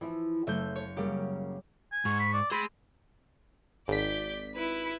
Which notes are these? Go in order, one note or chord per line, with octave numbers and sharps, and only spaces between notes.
E3 F3 E4
F#1 A3 E5 G6
C#5
F#2 C#3 G3 A#3 G4
G#5
G#2 C#6
B5
D5
C4 G#4 B5 C6
G#1 D5 G6 B6
E4 B4